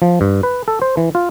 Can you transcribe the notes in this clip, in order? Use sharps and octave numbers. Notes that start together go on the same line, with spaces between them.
F3
G2
B4
A4
C5
E3
F4